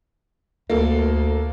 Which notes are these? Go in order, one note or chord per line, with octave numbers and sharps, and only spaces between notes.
D2 A#3 A4